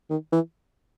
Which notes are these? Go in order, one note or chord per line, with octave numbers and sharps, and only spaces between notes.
D#3
E3